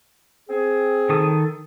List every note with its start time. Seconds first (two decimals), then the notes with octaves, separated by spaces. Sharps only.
0.49 C4 G#4
1.09 D#3 A4 D#6